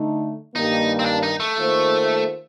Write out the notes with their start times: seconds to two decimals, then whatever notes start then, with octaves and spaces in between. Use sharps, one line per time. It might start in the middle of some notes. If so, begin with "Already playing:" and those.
Already playing: D3 A3 D#4
0.55 G2 D#3 G3 A#3 D#4
0.99 C4
1.06 D4
1.23 D#4
1.40 A3
1.57 D#3 A#3 F4 C5